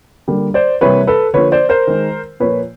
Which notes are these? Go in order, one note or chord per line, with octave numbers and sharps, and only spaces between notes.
D3 G3 A#3
C5 D5
C3 E3 G3 A#3 B4 C#5
A4 B4
D3 F3 A#3 B4 C#5
C5 D5
A#4 C5
D#3 G#3
A#2 F3 A#3 B4 C#5